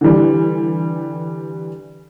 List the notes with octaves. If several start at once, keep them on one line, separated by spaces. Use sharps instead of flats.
D3 E3 G3